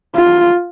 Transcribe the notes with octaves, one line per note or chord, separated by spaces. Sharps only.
F4